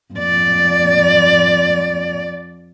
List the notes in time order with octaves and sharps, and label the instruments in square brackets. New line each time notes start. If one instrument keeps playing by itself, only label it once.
[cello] F2 D5